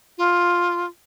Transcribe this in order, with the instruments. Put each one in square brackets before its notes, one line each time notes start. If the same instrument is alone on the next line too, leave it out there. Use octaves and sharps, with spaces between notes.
[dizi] F4